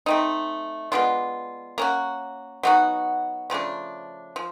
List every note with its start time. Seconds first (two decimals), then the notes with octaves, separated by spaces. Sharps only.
0.06 A3 C4 D#4
0.92 G#3 B3 D4 F4
1.78 A#3 C#4 F#4
2.63 F#3 B3 D#4 F#4
3.50 C#3 F3 A3 D4
4.36 F3